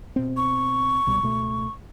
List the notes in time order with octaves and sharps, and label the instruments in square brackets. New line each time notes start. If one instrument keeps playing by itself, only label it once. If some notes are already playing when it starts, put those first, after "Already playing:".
[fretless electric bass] B2 C4
[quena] C#6
[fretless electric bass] C2 B2 G3
C#2 B2 A3